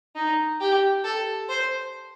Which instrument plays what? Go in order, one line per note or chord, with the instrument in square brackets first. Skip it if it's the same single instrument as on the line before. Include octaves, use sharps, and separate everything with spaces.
[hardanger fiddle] D#4
G4
A4
C5